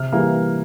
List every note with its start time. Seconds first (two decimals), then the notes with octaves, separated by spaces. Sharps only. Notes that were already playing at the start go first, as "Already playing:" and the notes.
Already playing: C3 F6
0.13 E3 G3 A#3